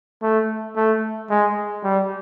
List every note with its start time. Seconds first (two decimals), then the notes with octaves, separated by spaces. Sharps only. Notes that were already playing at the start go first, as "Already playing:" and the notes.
0.23 A3
0.76 A3
1.30 G#3
1.84 G3